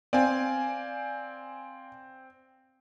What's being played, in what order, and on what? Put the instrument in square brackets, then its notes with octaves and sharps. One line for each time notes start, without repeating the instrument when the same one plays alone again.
[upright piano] C4 [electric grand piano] D5 F5 G#5